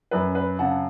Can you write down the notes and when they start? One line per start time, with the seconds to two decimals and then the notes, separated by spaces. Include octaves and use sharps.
0.11 F#2 B4
0.35 B4
0.59 C#3 F#5 A5